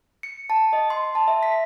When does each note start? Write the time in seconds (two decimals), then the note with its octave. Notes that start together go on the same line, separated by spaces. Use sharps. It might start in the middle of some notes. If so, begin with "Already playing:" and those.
0.23 C#7
0.50 A5
0.73 D#5
0.90 C6
1.15 A5
1.28 E5
1.43 B6